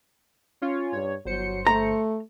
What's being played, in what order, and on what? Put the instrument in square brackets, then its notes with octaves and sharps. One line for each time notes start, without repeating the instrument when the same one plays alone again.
[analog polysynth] C#4 F4 C#5
[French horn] G2 [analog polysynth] C#5
[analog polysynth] G1 C5 C#7 [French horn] F#3
[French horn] A3 [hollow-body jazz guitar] A#5